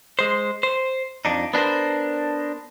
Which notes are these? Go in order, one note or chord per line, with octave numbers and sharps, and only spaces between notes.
G#3 C5
C5
F2 D4 D#4
B3 D4 G4 A#4 C5